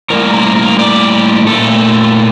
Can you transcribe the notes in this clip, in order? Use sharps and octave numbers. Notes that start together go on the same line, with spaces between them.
A2 G3 A#3 A#4
A#4
A#4
D5
A#2 A3 A4